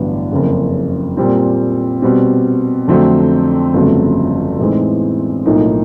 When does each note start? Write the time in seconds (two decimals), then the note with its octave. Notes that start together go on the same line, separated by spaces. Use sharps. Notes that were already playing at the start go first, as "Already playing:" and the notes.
Already playing: A1 G2 D3 F#3 B3
0.32 F#1 F2 C#3
1.17 A#2 G3 C4
2.02 B2 G3 C4
2.88 F2 D3 F#3 A3 C4
3.74 G1 F2 C#3 F#3 A3
4.59 A2 E3 G#3 C4 D#4
5.45 B1 A2 F3 A#3 D#4